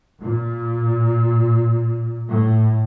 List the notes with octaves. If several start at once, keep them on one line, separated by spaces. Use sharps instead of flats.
A#2
A2